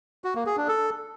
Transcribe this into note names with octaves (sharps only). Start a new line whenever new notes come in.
F#4
A#3
G#4
D4
A4